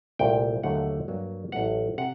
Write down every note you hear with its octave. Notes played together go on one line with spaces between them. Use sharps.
C2 A#2 A3 G5
D#2 D3 F#3 A3 F#5
G2 F#3 A#3
A1 A2 F#3 A3 F#5
C3 F#5